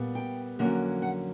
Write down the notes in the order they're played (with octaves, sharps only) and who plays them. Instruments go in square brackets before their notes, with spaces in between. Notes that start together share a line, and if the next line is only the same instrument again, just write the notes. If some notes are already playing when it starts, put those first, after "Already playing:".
Already playing: [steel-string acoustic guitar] A#2 G3 B3
G5
F2 D3 F#3 A#3 C#4
F#5